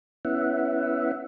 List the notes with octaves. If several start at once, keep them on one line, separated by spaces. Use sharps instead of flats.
B3 C#4 E4 E5 F#5